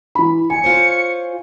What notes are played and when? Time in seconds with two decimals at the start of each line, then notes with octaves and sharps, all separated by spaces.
0.15 E3 B5
0.50 F2 G#5 C#7
0.64 F4 C5 C#5